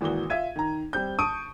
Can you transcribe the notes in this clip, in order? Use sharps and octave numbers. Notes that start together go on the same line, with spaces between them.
G#1 E3 A#3 F#4 G7
F4 E5 G#6 D#7
D#3 A#5
G3 C4 G6
A5 C#6 D#6 D7 D#7